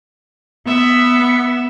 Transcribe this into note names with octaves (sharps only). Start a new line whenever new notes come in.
B3 E5